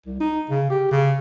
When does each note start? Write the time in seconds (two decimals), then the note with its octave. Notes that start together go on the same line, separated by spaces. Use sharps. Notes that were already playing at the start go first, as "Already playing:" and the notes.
0.06 C2
0.20 D#4
0.49 C#3
0.70 G4
0.91 C#3